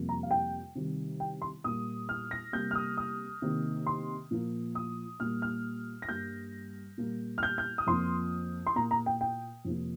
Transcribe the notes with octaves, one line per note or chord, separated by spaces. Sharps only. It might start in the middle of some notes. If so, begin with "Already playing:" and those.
Already playing: F2 C3 G3 A#3
A#5
F5
G5
C3 D#3 G3
G5
C6
A#2 G3 A#3 D#6
F6
A#6
C3 G3 A#3 G6
F6
D#6
D#6
C3 D#3 A#3
C6
A#2 F3 A#3
D#6
A#2 G3 A#3 F6
F6
A#6
G2 G3 A#3 G6
A#2 G3 A#3
F6
G6
G6
D#6
F2 F3 A#3 C6
C6
A#2 A#3 A#5
A#5
G5
G5
F2 C3 F3 A#3